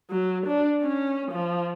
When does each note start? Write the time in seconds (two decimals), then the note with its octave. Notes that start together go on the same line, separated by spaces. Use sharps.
0.10 F#3
0.46 D4
0.82 C#4
1.31 F3